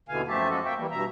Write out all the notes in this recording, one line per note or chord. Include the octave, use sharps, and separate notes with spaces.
D#2 B2 D3 E3 F5 G#5
F#2 F3 A3 G4 E5 A5
F3 G#3 F#4 A4
A#3 E5 G5
E3 G3 A#3
G2 B2 E5 A#5